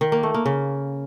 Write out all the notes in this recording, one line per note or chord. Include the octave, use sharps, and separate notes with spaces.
D#3
A#3
A3
A#3
C#3